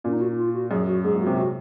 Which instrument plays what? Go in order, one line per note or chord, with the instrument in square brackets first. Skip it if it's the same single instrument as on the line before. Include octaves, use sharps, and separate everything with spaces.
[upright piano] A#2 [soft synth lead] C#4
[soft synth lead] D#4
F#4
F4
F#4
[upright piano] F#2 [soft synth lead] G#4
[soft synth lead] F#4
[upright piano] G#2 [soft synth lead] G#4
[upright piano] A#2
[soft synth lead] F#4
[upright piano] C3
[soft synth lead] F#4